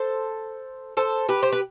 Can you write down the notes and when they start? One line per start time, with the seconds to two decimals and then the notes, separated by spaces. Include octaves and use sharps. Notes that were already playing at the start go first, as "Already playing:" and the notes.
Already playing: A4 C5
0.97 A4 C5
1.29 G4 B4
1.43 C5
1.52 B4